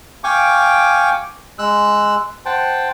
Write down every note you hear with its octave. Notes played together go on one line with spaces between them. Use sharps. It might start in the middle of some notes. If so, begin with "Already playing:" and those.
F5 G5 G#5 C#6 D6
G#3 E6 F#6
C5 F#5 G5 A5